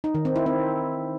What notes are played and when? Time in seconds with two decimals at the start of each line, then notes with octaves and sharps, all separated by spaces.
0.04 D#4
0.15 D#3
0.25 C4
0.36 E4
0.46 C4